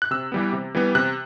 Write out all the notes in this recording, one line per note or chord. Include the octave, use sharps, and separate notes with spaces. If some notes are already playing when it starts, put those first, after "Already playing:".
F#6
C3 E6
E3 G3 B3
C3
E3 G3 B3
C3 F#6